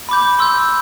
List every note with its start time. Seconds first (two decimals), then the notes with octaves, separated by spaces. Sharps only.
0.09 B5 D6 G6
0.39 C6 E6 G6